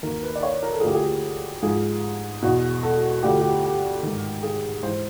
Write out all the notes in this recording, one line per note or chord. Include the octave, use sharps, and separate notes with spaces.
D#2 D#3 A#4
B4
D5
C#5
A#4
A4
G#4
D2 D3 F3 G4
G#4
G#2 F3 G#4
E2 B2
A4
D2 D3 F3 G4
G4
G4
G#2 D#3
G#4
G#2 E3 C5